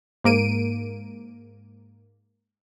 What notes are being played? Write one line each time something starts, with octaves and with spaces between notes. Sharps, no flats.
G#2 A#3 D7 D#7